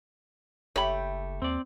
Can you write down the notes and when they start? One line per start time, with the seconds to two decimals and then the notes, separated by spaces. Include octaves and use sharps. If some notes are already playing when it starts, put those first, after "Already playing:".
0.76 F#1 A3 G4 C#5 G5 B5
1.42 D#2 C4 D5